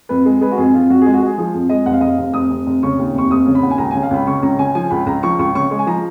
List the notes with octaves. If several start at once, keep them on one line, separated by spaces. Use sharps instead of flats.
F2 B4
G#3
G#3 B4
F#4
F2 G#4
F2 F4
F2 F#4
G#3 G#4
F#4
G#3 G#4
F3 G#4
F2
G#3 D#5
F1 F#5
F5
F1 D#5
F5
F1
F1 D#6
F1
F1
C#3 C#6
D#2
F1 C#6
F1 D#6
C#3
B5
D#2 F#5
G#5
C#2 A#5
C#3 G#5
F5
C#2 B5
C#3 C#6
C#2 A#5
C#3 G#5
F3 G#5
C#2 B5
C#2 A#5
F3 C#6
C#2 C#6
C#3 C#6
G#3 C#6
G#5
F3 A#5